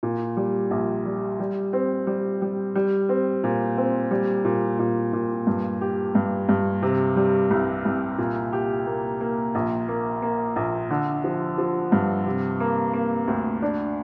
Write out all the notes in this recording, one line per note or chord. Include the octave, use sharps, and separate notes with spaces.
A#2
G3
A#1
G3
G3
C4
G3
G3
G3
C4
A#2
C4
G3
A#2
A#2
A#2
G2
G4
G2
G2
C3
G3
C2
C2
A#2
G4
A#3
A#3
A#1
A#3
A#3
A#1
D3
F3
F3
G2
C3
A#3
A#3
D2
D4